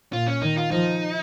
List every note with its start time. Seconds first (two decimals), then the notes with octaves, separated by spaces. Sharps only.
0.13 A#2 F4
0.27 C#4
0.42 D#3 D#4
0.57 F4
0.71 F3 D#4